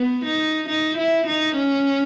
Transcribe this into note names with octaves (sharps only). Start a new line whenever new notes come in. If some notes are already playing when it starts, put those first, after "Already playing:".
Already playing: B3
D#4
D#4
E4
D#4
C#4